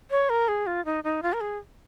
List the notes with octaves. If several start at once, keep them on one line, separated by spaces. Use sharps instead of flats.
C#5
A#4
G#4
F4
D#4
D#4
F4
A#4
G#4